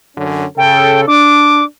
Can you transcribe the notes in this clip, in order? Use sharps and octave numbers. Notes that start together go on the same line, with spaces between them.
F#2 D3 C#4
C#3 A4 G5
D4 D6